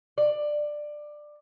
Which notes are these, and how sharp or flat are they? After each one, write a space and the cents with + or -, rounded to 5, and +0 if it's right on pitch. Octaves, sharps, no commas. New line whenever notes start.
D5 +15